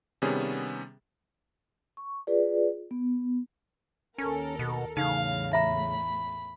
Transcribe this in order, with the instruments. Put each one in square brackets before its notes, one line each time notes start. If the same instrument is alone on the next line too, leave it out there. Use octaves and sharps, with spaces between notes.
[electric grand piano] C3 D#3 G3 B3 C#4 G#4
[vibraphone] C#6
F4 G#4 B4 D5
B3
[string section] D#2 A4 A#4 [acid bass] C#4
[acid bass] B2
[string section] E2 A2 [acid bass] C#3 [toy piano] D#4 [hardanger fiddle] F5
[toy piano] E5 A#5 [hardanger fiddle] B5